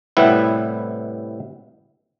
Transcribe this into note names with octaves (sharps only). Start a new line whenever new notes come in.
A2 C3 G3 B3 E4 B4